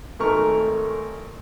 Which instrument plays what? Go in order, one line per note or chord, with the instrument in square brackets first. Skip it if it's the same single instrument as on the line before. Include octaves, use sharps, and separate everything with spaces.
[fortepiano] G#1 A3 A#4 C#6